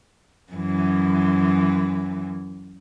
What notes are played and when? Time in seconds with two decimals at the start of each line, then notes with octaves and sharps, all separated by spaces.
0.52 F#2 E3